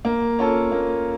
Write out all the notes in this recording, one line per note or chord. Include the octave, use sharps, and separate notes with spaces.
A#3
C#4 F4 A4
A#3